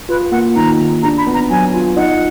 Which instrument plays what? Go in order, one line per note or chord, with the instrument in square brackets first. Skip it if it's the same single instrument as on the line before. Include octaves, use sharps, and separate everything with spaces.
[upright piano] F4 [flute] B4
[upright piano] A#3 [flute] F#5
[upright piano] D#3 [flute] A#5
[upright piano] D#3
[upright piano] D4 [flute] A#5
[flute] B5
[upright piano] B3
[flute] A#5
[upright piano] F#3 [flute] G#5
[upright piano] F4
[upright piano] D#4 [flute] F#5